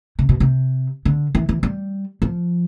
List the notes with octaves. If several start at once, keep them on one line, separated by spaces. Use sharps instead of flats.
C3
B2
C3
D3
E3
E3
G3
F3